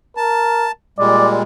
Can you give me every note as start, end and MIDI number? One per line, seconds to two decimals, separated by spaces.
0.17 0.69 70
0.17 0.72 81
0.99 1.43 46
0.99 1.43 55
0.99 1.43 56
0.99 1.29 74